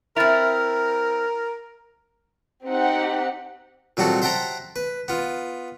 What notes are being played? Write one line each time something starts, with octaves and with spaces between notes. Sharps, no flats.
C4 E4 A#4 F6 A6 F7
C4 D#4 G4 F#5
A#2 F#3 G3 C4 F#4 A4
C5 E5 F#5 G5 A5 A#5
B4
B3 F4